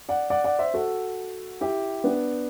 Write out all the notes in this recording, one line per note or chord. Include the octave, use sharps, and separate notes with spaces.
D5 F#5
D5 F#5
D5 F#5
C5 E5
F#4 A4
E4 G4
B3 D4